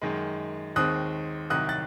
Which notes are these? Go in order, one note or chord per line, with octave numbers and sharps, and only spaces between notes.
F#2 D#3 G#3
D#2 D#3 G#3 C4 D#6 F#6
C2 C3 D#3 F#3 D#6 F#6
F#6 A6